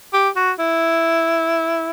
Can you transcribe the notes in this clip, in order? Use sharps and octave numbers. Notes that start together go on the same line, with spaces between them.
G4
F#4
E4